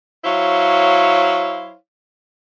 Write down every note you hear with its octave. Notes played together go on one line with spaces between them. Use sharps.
F#3 E4 C5 C#5 F5